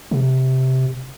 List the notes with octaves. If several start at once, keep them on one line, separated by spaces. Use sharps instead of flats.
C3